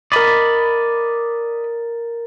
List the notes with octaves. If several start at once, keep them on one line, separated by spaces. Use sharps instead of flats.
A#4 D5 D#5 B5 A6